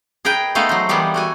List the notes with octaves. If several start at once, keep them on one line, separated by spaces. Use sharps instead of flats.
G#4 A#4 B4 D#5 G5
G#3 A3 B3 D#4 D#5 F5
F#3 C5
E3 G3 G#3 A#3 B3
A3 F#4 G#5